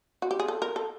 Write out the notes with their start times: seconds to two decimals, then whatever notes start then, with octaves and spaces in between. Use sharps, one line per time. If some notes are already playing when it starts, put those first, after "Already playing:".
0.22 F#4
0.31 G4
0.40 G#4
0.48 A4
0.62 A#4
0.76 A4